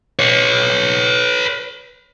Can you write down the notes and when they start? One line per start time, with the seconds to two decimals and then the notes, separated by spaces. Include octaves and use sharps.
0.19 B4 C#5